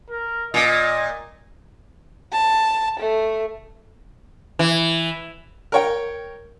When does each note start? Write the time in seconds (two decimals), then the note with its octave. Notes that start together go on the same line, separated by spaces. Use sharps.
0.10 A#4
0.54 A#2 D#5
2.33 A5
2.99 A3
4.59 E3
5.72 A#4 C#5 G5